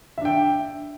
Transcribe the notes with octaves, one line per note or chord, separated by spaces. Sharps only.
D4 E5 G5